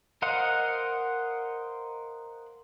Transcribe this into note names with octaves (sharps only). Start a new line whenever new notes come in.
A#4 C5 D#5 F5 F#5